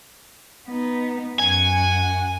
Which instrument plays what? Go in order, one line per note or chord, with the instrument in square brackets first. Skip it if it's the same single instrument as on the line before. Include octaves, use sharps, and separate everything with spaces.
[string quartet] B3 D#4
[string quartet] F#2 F#5 [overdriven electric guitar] G#5